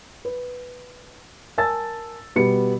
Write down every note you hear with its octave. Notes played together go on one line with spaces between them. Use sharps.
B4
A#4 G#5 A5 E6 A6
B2 G3 B3 C#7